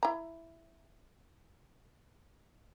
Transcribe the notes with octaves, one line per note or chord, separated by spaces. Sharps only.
E4 A#5